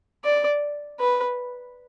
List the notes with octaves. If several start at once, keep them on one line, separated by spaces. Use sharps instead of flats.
D5
B4